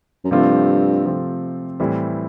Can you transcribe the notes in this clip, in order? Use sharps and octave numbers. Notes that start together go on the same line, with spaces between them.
F#2
G2 C3 F3 A3 C4 F4
C3 F3 A3 C4 F4
A2 E3 G3 C4 E4